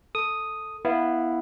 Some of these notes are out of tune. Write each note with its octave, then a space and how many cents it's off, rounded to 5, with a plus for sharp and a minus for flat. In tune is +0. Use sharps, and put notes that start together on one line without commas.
A4 +0 D#6 +0
B3 -5 E4 +0 F5 -20